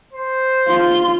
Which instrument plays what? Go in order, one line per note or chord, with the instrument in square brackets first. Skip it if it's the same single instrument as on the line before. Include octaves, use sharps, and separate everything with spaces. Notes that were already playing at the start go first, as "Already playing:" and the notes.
[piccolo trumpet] C5
[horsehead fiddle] F4 [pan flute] C6